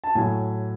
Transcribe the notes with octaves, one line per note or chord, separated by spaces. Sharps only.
A5
A2 F#3 G#5